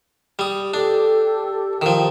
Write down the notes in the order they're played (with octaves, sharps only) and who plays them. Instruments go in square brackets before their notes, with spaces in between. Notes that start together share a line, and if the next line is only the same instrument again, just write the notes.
[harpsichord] G3 D#6
[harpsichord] D4 [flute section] G4 A4
[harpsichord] D#3 F3 [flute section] G5